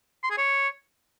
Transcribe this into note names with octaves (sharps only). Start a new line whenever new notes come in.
C6
G#4
C#5